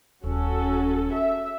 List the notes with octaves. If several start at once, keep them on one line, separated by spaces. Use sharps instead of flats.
D#1 C#4 F#4 A4
E5